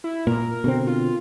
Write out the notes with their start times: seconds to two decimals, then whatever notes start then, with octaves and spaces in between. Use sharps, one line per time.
0.04 E4
0.27 A#2 A#4
0.64 B2 D3 C4
0.87 F4